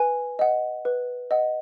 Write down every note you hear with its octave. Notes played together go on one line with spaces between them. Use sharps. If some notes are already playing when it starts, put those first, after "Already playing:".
Already playing: B4 G#5
D#5 F#5
B4
D#5 F#5